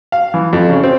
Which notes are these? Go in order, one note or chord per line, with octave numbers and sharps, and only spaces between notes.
F5
E3
F2
C#3
C4